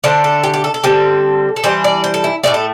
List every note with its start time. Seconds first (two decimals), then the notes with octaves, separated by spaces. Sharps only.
0.04 D3 A3 D4 C5
0.24 A4
0.44 G4
0.54 G4
0.64 A4
0.74 A4
0.84 D3 G3 C4
1.56 A4
1.64 E3 G3 D4 C5
1.84 D5
2.04 C5
2.14 A4
2.24 E4
2.43 A2 E3 A3 D5
2.54 A4